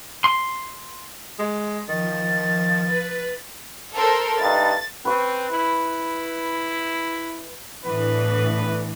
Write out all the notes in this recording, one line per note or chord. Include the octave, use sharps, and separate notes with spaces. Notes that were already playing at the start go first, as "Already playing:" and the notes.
C6
G#3
D#3 F3 A6
B4
A4 A#4 C5
G2 D#4 E4 A6
C4 B4 C#6
E4
A2 D3 E3 B3 B4